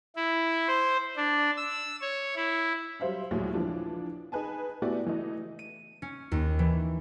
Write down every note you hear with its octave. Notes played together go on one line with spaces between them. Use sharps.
E4
C5
D4
E6
C#5
E4
F#3 G3 C5 E5 F5
A#1 D#2 A2 F#3 G#3 A3
E3 F3 D4
D#4 G#4 B4 G#5 A5
A3 B3 E4 F#4 G4 D5
E3 A3 D#5
D#7
C#4
D#2
E3